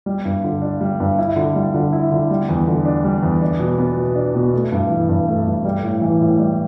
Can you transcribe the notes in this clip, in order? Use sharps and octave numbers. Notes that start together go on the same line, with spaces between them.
G3
G2
D3
D4
G3
G2
E4
D3
G3
D3
E4
D3
G3
E2
D3
D4
G3
E2
D4
B2
B3
B2
D4
B2
A3
G2
E3
G2
A3
G2
G3
A2
E3
A2
G3